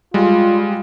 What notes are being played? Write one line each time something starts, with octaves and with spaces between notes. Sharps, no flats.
G3 G#3 F4